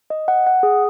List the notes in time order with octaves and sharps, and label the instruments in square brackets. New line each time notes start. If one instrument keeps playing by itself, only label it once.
[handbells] D#5
F#5
F#5
G#4